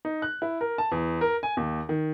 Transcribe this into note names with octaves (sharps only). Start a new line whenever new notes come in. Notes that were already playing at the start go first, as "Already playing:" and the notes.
D#4
F#6
E4
A#4
A5
E2
A#4
G#5
D#2
D#3